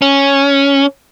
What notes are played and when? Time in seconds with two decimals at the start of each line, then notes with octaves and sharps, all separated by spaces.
0.02 C#4